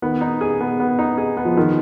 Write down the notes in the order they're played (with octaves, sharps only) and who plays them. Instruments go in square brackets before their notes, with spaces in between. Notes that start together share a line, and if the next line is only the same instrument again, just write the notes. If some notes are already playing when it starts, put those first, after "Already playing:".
[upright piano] D#3 [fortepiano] B3
[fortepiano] D#4
G#4
B3
B3
D#4
G#4
B3
[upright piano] F3
[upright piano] D#3 [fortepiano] F3